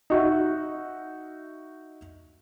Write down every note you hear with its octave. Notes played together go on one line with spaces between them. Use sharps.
D#4 F#4 E5